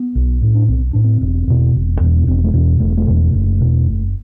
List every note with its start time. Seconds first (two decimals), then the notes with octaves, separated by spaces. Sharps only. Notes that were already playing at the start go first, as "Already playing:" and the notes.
Already playing: B3
0.15 B1
0.42 A2
0.55 D4
0.68 B1 C4
0.93 A2 D4
1.04 C4
1.21 E1
1.47 E2 B2
1.75 E1
2.01 E2 B2
2.17 B3
2.27 E1 C4
2.44 A3
2.54 E2 B2 B3
2.80 E1 A3
2.97 A3
3.07 E2 B2
3.16 A3
3.34 F#1
3.60 E2 B2
3.87 F#1